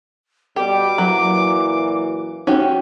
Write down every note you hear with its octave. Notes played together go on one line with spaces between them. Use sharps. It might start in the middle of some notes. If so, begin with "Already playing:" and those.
B2 G3 G4 D6
F#2 A#2 E3 F#3
C#4 D#4 F#4 G4